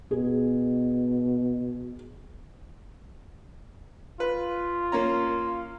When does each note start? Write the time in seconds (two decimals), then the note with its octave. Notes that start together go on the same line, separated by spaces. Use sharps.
0.11 B2 G#4
4.20 F4 B4
4.92 A#3 C#4 A#5